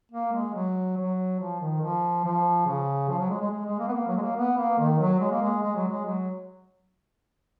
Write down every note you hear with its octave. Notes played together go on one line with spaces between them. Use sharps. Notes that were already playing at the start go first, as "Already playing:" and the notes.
A#3
G#3
F#3
F#3
F3
D#3
F3
F3
C#3
F3
F#3
G#3
G#3
G#3
G#3
A#3
B3
A#3
F#3
G#3
A#3
B3
A#3
D#3
F#3
G#3
A#3
G#3
G#3
F#3
G#3
F#3